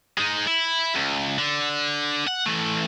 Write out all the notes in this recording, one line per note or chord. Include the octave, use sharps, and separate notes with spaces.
G#3 D#4
E4
C#2
D3
F#5
E3 A3